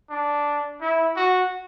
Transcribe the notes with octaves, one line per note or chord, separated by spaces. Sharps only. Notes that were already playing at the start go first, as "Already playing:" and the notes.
D4
E4
F#4